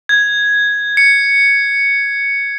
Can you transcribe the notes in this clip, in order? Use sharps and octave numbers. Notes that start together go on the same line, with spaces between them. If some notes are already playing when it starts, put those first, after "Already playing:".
G#6
C#7